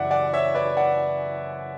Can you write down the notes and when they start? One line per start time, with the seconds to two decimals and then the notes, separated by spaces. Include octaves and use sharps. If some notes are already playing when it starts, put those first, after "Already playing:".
Already playing: F#1 F#2 E3 D5 E5 F#5
0.11 D5 F#5
0.33 C#5 E5
0.54 B4 D5
0.77 D5 F#5